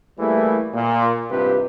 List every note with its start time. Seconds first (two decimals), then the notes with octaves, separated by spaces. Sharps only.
0.19 E3 G3 A3 A#3 E4 G#4
0.74 A#2
1.30 G#1 G2 C3 F4 G4 B4